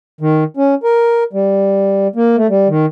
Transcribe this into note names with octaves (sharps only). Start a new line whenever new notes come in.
D#3
C#4
A#4
G3
A#3
A3
G3
D#3